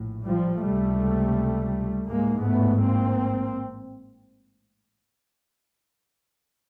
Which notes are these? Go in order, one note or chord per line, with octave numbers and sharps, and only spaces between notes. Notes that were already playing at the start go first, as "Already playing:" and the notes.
Already playing: A#1 A2
F3 G3
C#2 C3 G3 A3
A1 G#2 G#3 A#3
A3 B3
A#3 C4